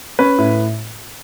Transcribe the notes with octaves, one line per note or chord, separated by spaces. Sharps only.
C#4 B4
A2